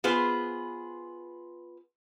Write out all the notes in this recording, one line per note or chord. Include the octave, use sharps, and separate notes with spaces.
B3 F4 G#4 B4 C5